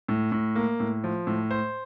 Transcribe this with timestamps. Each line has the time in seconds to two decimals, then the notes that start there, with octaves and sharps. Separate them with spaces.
0.08 A2
0.32 A2
0.56 A#3
0.80 A2
1.04 F3
1.27 A2
1.51 C5